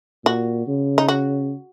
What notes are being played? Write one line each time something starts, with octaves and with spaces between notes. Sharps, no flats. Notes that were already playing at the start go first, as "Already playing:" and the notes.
A#2 F#4
C#3
D#4
F#4